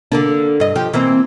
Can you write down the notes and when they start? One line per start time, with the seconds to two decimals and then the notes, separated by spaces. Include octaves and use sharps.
0.12 D3 A#3 D4
0.60 G2 D#5
0.76 F3 G4
0.93 E3 A#3 C4